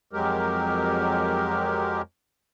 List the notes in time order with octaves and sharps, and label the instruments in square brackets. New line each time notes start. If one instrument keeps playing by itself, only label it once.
[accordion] F2 F#3 G#3 G4 A#4